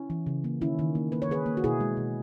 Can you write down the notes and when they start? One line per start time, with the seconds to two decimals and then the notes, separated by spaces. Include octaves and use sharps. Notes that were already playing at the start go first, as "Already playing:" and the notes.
Already playing: C#4 E4
0.10 E3
0.27 C#3
0.44 A#3
0.61 D#3 C#4 E4
0.79 D#3
0.95 A#3
1.12 A#3 B4
1.22 C#5
1.29 D#3 G#4 B4
1.46 A#3
1.57 F#4
1.64 B2 E4 G#4
1.80 G#3
1.97 B2